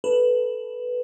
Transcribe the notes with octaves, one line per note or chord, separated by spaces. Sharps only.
A4 B4